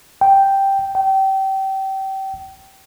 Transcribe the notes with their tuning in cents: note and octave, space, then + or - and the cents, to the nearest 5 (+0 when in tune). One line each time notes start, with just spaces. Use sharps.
G5 +0
G5 -25